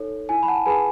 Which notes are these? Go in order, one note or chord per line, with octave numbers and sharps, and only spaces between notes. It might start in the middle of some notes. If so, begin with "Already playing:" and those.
Already playing: D#4 A4 C#5
E4 G#5
B5
F#5 A5
G#4 B4 G#5 B5